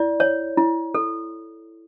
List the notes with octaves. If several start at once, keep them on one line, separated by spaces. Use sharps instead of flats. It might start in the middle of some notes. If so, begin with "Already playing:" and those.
Already playing: E4 D5
C#5
E4
A4